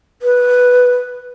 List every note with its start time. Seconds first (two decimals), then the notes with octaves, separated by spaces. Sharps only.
0.22 B4